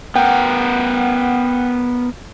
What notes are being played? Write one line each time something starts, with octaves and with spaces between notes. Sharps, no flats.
B3 A#4 F#5 G5